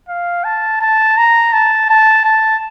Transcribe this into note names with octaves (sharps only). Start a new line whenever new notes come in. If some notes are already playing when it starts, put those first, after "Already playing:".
F5
A5
A5
A#5
A5
A5
A5